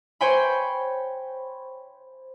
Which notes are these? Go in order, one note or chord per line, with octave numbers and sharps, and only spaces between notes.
C5 C#5 G5 G#5 B5